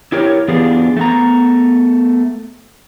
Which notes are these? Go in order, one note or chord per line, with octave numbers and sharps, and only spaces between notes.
E4 G4 A#4 C#5
E3 B3 D4 F4 G4 G#4
A3 B3 A#5